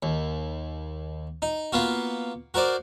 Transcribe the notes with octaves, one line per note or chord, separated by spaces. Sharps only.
D#2
D#4
A#3 B3 F4 F#4
F#4 A#4 C5 D5